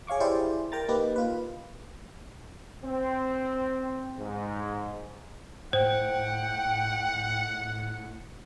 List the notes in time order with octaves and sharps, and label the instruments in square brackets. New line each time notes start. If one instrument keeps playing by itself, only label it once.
[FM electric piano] G#4 C#5 F5 C#6 D6
E4 G4 G#4 C5 D5
A#4 G5 A#5 A6
A#3 D#4 G4 B4
F4 B4
[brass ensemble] C4
G#2
[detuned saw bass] A2 [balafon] C5 [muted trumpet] F#5 [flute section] G5